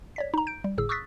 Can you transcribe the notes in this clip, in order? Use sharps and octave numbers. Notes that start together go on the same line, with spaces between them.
C#5 D5 B6
D#4 A#5
G6 D7
G3
G1 A2 G#4 E6
C#6 D#6 E6 F#6 A6 B6